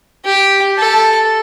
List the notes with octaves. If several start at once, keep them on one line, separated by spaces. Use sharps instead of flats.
G4
A4